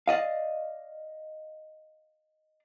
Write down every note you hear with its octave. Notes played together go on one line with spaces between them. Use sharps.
D5 D#5 F5